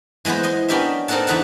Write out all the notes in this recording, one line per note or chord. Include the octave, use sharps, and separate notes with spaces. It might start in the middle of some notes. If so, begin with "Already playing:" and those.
E3 G#3 B3 B4 C5
G#3 D#5 C6
B3 C#4 D4 G4 A#4 E5
C4 D#4 A4 A#4 F#5 A5
E2 D3 D#4 B4 F#5 A5